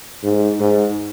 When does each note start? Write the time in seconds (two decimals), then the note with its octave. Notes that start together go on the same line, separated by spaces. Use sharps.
0.23 G#2
0.60 G#2